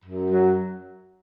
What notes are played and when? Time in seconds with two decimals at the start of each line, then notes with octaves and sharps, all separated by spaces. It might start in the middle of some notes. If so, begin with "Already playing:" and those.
0.04 F#2
0.30 F#3